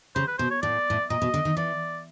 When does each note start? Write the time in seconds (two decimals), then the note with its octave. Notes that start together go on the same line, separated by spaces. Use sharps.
0.15 C#3 C5
0.28 B4
0.38 B2 C5
0.51 C#5
0.62 A2 D5
0.90 A2
1.10 A#2 D#5
1.22 B2
1.34 D3
1.45 D#3
1.57 E3 D5